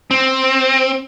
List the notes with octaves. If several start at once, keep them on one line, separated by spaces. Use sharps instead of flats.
C4